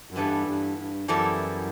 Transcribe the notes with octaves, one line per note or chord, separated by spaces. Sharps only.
F#2
G2 E3 G3 B3 E4 A4
G2
G2
F#2 E3 G3 B3 E4 A4